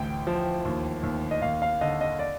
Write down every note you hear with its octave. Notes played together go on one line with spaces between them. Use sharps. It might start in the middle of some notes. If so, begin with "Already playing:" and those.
Already playing: A1 D2 G5
F3
D#2
D#2
D#5
D#2 F5
F5
D3 D#5
D#5
D5